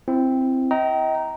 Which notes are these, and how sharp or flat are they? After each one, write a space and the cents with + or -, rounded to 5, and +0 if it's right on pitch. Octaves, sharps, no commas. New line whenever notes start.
C4 +0 E4 +25
D#5 +35 G5 -25 A#5 +0